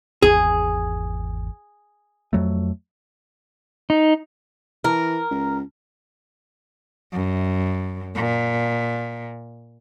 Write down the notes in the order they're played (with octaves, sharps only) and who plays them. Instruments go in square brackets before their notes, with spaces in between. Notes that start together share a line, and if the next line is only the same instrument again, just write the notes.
[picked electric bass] G#1 E2 [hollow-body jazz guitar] G#4
[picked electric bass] F2 F#3 A3
[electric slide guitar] D#4
[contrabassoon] E3 [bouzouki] A#4
[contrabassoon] C#2
[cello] F#2
A#2